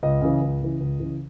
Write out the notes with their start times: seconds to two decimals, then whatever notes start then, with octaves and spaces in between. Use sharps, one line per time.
0.03 C#2 D#5
0.22 C#3 E3
0.41 C#2
0.60 C#3 E3
0.80 C#2
0.99 C#3 E3